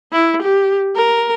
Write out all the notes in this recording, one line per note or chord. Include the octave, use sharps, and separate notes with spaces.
E4
G4
A#4